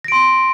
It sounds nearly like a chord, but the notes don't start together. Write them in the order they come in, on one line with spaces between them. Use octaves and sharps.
A#6 D7 C6